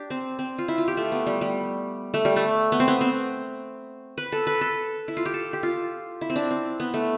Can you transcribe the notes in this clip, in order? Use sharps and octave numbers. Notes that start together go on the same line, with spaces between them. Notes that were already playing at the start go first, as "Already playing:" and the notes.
Already playing: D4 G4
C4
C4
F4
E4
F4
G4
A3
B3
G3
G3
A3
G3
A3
B3
C4
B3
C4
B4
A4
B4
A4
E4
F4
G4
A4
G4
F4
E4
C4
D4
C4
B3
A3